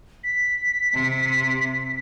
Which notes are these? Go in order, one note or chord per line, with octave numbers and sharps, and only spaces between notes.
B6
C3